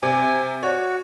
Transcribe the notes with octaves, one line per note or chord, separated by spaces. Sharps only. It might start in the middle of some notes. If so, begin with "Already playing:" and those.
C3 G#5
F#4 C#5